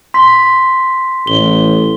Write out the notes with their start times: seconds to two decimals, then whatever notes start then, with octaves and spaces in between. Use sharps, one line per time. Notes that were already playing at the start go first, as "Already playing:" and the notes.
0.14 C6 B6
1.27 A1 G7